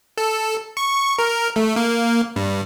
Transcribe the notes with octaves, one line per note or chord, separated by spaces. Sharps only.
A4
C#6
A#4
A3
A#3
G2